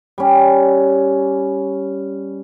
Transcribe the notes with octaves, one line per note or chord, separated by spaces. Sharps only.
G3 C#4